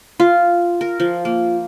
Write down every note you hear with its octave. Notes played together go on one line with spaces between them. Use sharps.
F4
A#4
F3
A#3